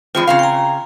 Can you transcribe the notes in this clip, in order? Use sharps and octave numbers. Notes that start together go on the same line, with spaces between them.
E2 G#3 C4 F4
C#3 C4 F5
G5 A#5